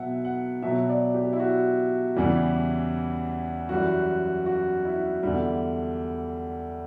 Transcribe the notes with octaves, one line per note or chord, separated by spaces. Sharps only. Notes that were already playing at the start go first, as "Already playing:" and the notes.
Already playing: B2 F#3 E5 F#5
F#5
B2 F#3 E5
D5
G4
E4
F#4
E2 C#3 E3 G3 G4
F#2 E3 G3 F#4
F#4
E4
E2 D3 G3